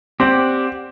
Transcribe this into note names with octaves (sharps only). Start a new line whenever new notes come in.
C4 G4 D5 F#5